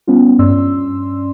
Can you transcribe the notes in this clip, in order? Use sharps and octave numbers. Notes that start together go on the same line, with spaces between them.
G3 B3 C#4 F4
G2 C#4 D5 C6 E6